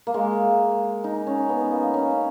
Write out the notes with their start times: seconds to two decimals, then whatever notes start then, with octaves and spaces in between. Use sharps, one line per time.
0.07 A#3
0.14 G#3
1.04 D#4
1.27 C#4
1.49 B3
1.71 A#3
1.94 C#4